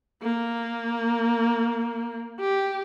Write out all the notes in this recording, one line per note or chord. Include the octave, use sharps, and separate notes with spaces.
A#3
G4